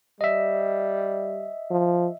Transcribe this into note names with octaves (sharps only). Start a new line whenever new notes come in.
G3 D#5 E5
F3